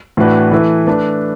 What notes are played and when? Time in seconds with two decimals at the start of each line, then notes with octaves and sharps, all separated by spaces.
0.17 A2 E3 D4 F#4 B4
0.52 E3 A3 E4 B4
0.87 A3 D4 B4